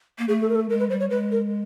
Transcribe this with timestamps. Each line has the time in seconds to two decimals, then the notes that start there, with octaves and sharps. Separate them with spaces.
0.19 A#3
0.28 A3 G#4
0.42 A4
0.49 A#4
0.55 A4
0.70 G#3 A#4
0.80 B4
0.90 G3 C5
1.00 C#5
1.10 G#3 B4
1.31 A#4